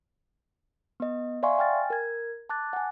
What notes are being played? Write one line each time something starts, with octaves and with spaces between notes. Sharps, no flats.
B3 D#5
D5 E5 F5 G#5 C6 C#6
G5 G#5 F6 A6
A#4 G#6
A5 D6 F#6 A6
F#5 G#5